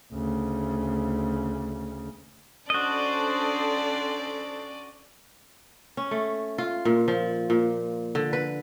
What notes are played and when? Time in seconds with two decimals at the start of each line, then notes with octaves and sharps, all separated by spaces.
0.12 D2 C#3
2.70 C#4 D4 F#4 A4 C5 D5 D#5
5.97 C#4
6.11 A3
6.58 F4
6.85 A#2
7.08 F3
7.50 A#2
8.15 D3
8.33 B4